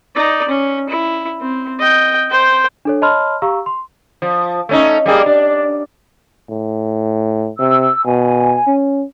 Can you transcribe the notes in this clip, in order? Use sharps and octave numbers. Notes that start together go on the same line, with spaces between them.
D#4 D5
C#4
E4
C4
D#5 G5
C5 G5
D4 A4 C#5
C#5 D#5 A5 B5 C6 F6
G4 F5 A#5 C#6 E6
C6
F3
A3 C#4 D#4
G3 A#3 G#4
D4
A2
C3 E6
B2 G#5
C#4